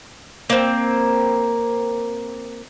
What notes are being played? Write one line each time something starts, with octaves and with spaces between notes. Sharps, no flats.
A#3 C4